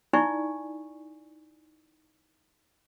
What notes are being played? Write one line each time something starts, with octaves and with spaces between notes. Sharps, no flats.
D#4 E4 D5 G#5 C#6